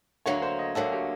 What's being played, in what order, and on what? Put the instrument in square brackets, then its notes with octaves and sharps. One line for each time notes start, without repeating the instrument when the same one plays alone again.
[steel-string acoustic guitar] D2 D3 F#3 A#3 [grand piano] C#5
[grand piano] C5
D#5
[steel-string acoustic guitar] D2 D3 F#3 A#3 [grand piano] A4
[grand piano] G4